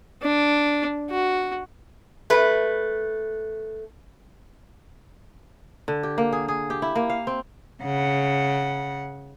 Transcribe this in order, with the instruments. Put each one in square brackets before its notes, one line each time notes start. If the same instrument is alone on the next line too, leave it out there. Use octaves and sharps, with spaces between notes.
[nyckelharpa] D4
F#4
[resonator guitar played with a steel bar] A3 B4
[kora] D3
G4
A#3
G#4
G#4
G4
E4
A#3
F5
C4
[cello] C#3 F#5